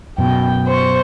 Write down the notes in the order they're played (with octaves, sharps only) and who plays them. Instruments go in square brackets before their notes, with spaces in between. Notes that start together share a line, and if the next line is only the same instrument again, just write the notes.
[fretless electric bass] F#2 B2 [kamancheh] G5
[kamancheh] C5 C#6